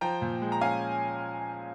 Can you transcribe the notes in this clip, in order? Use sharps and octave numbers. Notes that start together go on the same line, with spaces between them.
F3 G5 A#5
A#2
G#3
A#5
C#4 F5 G#5